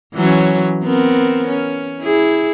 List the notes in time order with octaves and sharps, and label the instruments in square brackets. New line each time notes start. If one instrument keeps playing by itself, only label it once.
[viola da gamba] E3 F#3 C#4
B3 C4 A#4
C#4
E4 G#4